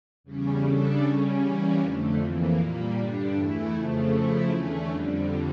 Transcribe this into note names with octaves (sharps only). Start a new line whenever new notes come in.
E2 C#3 G3 C#4
C#3 G3 D4 A4
C#3 G3 C#4
E3 G3 A#3 C#4
F2 D3 A3
F2 E3 A#3
A#2 G3 A#3
G2 D3 G3 D4
E2 E3 A3 E4
F2 C#3 F3 A3
C#3 F3 A3 E4
E2 D3 A3 C#4
F2 D3 G3